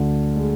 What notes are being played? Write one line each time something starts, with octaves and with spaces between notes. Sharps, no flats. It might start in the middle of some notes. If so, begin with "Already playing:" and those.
Already playing: D2 D3
G#3